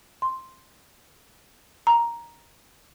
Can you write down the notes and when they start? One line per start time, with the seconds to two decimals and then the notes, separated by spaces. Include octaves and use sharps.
0.22 C6
1.87 A#5